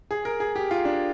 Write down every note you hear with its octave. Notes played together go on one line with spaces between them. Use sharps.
G#4
A#4
G#4
G4
F4
D4